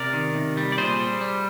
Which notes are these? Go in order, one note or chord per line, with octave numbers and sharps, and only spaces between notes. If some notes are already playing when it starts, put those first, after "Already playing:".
Already playing: C3 A#4 D5
D#3
C3
G3
D5
A#2 G#4 C5
G3
G3